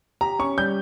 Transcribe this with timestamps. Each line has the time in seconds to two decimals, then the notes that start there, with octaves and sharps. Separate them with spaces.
0.21 G4 A#5
0.39 C#4 C#6
0.58 G3 G6